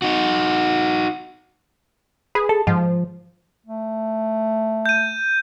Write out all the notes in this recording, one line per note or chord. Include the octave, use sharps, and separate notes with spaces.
D#4 F#4
G#4 B4
A4
G#2 F3
A3
G6 D#7